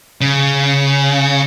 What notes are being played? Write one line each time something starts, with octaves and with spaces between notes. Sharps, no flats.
C#3